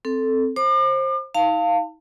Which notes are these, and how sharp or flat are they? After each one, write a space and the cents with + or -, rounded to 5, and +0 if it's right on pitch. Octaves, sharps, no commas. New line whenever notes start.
C4 +0 A4 +0
C5 +25 D6 +40
D#4 +40 F5 +0 A5 +30